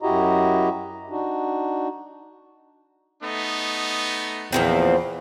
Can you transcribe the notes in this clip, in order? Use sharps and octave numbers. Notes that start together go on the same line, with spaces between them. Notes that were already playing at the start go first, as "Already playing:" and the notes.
F#2 E4 F#4 G4 D#5 A#5
D4 D#4 F#4
A3 B3 D#4
E2 A#2 F3 C4